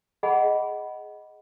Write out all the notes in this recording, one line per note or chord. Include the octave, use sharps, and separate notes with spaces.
G#4 D#5 F#5 G#5 B5